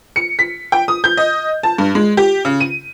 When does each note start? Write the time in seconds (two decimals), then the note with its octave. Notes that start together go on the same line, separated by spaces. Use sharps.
0.16 C#7
0.39 B6
0.72 G5
0.88 D#6
1.04 G6
1.17 D#5
1.63 A5
1.78 G2
1.95 G#3
2.17 G4
2.45 C#3
2.61 D#7